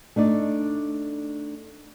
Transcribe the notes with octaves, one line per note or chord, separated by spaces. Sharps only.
A3 D4 D#4 D5